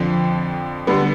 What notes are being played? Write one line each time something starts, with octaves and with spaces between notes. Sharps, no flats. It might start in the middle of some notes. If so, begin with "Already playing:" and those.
Already playing: F2 D3 F3
D3 G3 B3